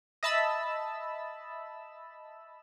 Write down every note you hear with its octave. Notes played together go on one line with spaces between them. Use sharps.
D#5 E5 A5 B5 E6